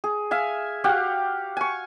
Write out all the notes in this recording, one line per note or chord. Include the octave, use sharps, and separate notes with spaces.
G#4
E5 F5 G#5
F#4 G4 F5 F#5
G#5 C#6